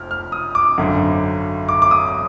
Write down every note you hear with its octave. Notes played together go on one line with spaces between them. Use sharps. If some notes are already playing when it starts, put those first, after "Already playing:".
Already playing: F1 F2 F6
F6
D#6
D6
G#1 F#2 D3
D6
D6
D#6